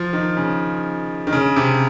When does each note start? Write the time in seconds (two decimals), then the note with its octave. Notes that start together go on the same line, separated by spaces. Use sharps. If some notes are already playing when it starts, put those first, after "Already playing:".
Already playing: F3
0.13 D#3
0.37 C#3
1.27 D#3
1.33 C#3
1.56 C3